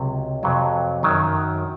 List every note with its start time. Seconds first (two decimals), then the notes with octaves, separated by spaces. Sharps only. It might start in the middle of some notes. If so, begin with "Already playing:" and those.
Already playing: C#2 C3 F#3
0.43 F2 C3 F#3
1.03 F#2 D#3 F#3